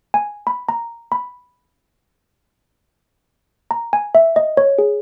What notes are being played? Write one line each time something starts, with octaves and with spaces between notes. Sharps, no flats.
G#5
B5
A#5
B5
A#5
G#5
E5
D#5
C#5
G#4